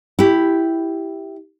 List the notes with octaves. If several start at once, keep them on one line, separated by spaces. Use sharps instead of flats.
E4 G4